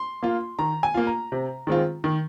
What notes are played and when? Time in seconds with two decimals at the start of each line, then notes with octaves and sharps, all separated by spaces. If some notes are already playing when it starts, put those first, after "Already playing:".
Already playing: C6
0.23 A#3 F4
0.59 D#3 A#5
0.83 G#5
0.94 A#3 F4
1.07 A#5
1.32 C3
1.67 D#3 G#3 C4 F4
2.04 D#3